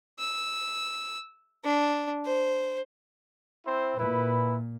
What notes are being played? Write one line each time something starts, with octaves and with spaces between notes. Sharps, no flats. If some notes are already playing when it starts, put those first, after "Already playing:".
E6
D4
C5
C4 E4 C5
A#2 E4 B4